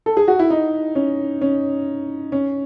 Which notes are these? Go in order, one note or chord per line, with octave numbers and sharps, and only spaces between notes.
A4
G#4
F#4
E4
D#4
C#4
C#4
C#4